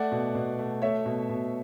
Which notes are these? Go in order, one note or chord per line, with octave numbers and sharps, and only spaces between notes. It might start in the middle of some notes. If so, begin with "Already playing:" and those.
Already playing: A3 D5 F#5
B2
B2
A3
A3 C#5 E5
B2
B2